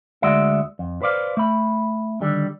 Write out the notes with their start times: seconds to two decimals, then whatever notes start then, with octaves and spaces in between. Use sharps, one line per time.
0.22 D2 G#3 F#4 D5 E5
0.79 F2
1.02 B4 C5 D5 F5
1.37 A3 B5
2.21 D3 D#3 G3